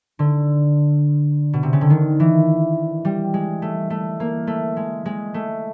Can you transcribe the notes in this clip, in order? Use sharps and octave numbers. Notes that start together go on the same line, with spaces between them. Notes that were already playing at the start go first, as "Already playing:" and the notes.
D3
B2
C3
C#3
D3
D#3
E3
G3
G#3
A3
A3
A#3
A3
G#3
G#3
A3